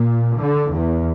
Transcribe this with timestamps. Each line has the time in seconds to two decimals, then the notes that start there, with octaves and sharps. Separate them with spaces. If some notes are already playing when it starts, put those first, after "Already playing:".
Already playing: A#2
0.38 D3
0.72 E2